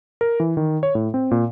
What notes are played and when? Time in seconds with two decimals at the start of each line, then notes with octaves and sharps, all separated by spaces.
0.21 A#4
0.40 E3
0.57 D#3
0.83 C#5
0.95 A2
1.14 C4
1.31 A#2